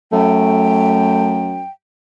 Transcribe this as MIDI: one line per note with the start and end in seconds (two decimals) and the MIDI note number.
0.12 1.63 42
0.12 1.58 57
0.12 1.70 79